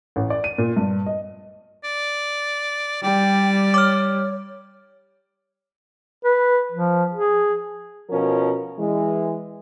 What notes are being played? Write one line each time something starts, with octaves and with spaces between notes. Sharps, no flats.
A1
D5
D#7
A#2
G2
D#5
D5
G3 D5 G5
C#5 D6 F6
B4
F3
G#4
B2 F3 C#4 A#4
E3 G#3